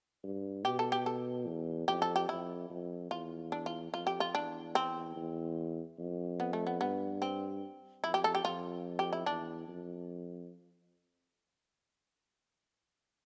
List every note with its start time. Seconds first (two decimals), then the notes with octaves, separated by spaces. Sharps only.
0.24 G2
0.65 B2 G4
0.79 A4
0.92 G4
1.06 A4
1.47 E2
1.88 F2 G4
2.02 A4
2.16 G4
2.29 F2 E4
2.70 F2
3.11 E2 F4
3.52 D4
3.66 F4
3.93 F2 F4
4.07 G4
4.20 F4
4.35 E2 D4
4.75 C4
5.16 E2
5.99 F2
6.40 B3
6.53 A3
6.67 B3
6.81 G2 B3
7.22 C4
8.04 F2 E4
8.14 G4
8.24 A4
8.35 G4
8.44 F2 F4
8.99 G4
9.13 E4
9.26 E2 D4
9.68 F2